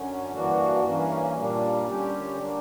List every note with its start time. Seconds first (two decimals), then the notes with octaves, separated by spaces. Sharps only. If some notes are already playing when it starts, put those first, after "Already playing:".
Already playing: F#2 D3 F#3 C#4
0.32 G2 E3 A#3 D4 F#4
0.83 G2 E3 A#3 C#4
1.35 A#2 G3 A#3 D4
1.87 D3 G3 C#4 G4
2.38 D3 A#3 D4